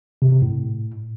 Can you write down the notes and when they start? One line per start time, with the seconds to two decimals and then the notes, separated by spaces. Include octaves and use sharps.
0.22 C3
0.32 C3
0.42 A2